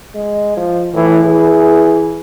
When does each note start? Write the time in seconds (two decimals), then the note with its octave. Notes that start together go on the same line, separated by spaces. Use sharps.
0.15 G#3
0.57 F3
0.94 A2 E3
1.24 E3 G#4